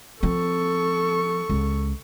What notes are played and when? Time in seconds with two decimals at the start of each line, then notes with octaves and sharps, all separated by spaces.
0.23 F3 C4 A4 C#6
1.50 C#2